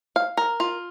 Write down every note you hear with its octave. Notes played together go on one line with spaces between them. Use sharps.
F5
A#4
F4